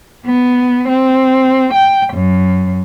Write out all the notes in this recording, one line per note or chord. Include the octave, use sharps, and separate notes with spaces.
B3
C4
G5
F#2